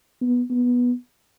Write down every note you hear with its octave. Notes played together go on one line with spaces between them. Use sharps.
B3
B3